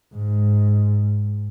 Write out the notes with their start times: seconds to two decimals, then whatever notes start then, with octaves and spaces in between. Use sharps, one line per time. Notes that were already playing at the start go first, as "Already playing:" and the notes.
0.15 G#2